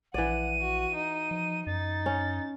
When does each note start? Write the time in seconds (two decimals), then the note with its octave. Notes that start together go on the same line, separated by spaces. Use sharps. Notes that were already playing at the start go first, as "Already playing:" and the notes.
0.14 A#1 E3 D5 F#5 D#7
0.62 F#4
0.95 D#4
1.31 F3
1.67 F#2 D#4 A6
2.06 C#4